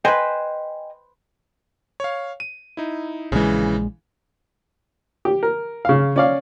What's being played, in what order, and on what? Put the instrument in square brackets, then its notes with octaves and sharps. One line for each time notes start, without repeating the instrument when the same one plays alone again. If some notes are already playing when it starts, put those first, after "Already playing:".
[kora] B4 C5 [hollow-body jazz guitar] D#5 G5 G#5
[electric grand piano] C#5 F5
D#7
D#4 E4
[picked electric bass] A#1 G#3 [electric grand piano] C#3 E3
[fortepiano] G4
A#4
C#3 F5
C#4 D5 F5